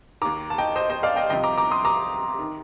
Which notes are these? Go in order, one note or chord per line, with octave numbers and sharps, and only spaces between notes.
D#2 D#3 A#5 D6
A5
D#5 G5
C5 D#5
C5 D#5
D5 F5
D#5 G5
C2 C3 F3 D#5 G5
A#5 D6
A#5 D6
C6 D#6
A#5 D6
D#3